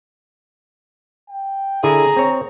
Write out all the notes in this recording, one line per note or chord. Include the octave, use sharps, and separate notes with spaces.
G5
D3 E4 G#4 A#5
C4 C#5